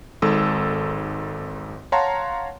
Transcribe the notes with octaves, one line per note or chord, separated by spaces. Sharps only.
G#1 G#2 A4 E6
C#5 F5 F#5 A5 A#5 C6